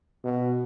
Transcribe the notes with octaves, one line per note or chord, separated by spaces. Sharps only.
B2